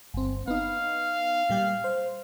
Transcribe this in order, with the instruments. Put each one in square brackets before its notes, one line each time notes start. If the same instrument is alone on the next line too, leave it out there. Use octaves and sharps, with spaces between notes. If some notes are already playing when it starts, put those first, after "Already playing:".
[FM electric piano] G1 C4
[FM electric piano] B3 D#4 [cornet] F5
[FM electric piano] A#2 G3 G4
C5